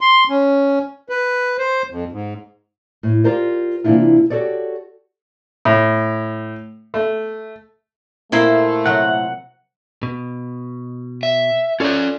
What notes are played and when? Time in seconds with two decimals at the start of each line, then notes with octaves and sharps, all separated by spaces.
0.01 C6
0.29 C#4
1.09 B4
1.59 C5
1.91 F2
2.12 G#2
3.03 A2
3.24 F4 G4 A#4 C5 D5
3.84 C3 E3 A#3 D4 E4 F4
4.30 F#4 G4 A4 C#5 D5
5.65 A2
6.94 A3
8.32 A#2 A3 A#3 E4 C5
8.86 C3 F#3 F#5
10.03 B2
11.23 E5
11.80 C#4 F4 A4 D5 A#5